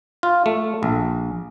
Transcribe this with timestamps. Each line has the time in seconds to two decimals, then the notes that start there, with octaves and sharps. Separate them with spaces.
0.23 F4
0.46 A3
0.83 A#1